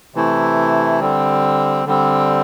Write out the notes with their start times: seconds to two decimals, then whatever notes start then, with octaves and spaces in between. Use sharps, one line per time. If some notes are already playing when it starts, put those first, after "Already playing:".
0.15 C3 E3 A3 E4
1.00 D3 G3 C4
1.86 D3 G3 C4